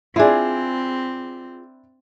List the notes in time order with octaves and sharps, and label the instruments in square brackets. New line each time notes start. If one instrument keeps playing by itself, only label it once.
[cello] C4 [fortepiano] D4 E4 [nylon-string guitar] F4 G#4